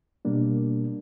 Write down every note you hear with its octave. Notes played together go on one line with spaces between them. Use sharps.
B2 G3 A#3 D4